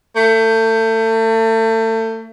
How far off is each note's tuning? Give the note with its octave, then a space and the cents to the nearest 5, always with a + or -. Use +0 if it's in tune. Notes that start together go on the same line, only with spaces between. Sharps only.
A3 +30